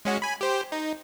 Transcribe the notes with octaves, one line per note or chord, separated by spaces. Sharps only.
G#3 C#4 F#4
G#5 B5
G4 C5
D#4